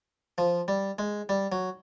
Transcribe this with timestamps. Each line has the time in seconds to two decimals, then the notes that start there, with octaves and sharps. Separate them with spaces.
0.38 F3
0.68 G3
0.99 G#3
1.29 G3
1.52 F#3